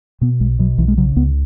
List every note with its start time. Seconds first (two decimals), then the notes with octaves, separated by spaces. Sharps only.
0.21 B2 B3
0.40 B1 G#3
0.59 B2 F#3
0.78 B1 E3
0.88 G#3
0.98 C#3 F#3
1.16 C#2 B3